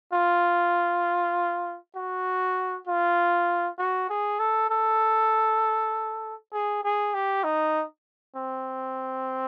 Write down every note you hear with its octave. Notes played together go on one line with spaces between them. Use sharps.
F4
F#4
F4
F#4
G#4
A4
A4
G#4
G#4
G4
D#4
C4